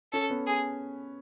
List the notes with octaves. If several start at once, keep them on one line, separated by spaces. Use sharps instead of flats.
C#4 A4
B3
G#4